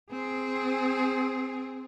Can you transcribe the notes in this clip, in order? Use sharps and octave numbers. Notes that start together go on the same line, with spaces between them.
C4 G#4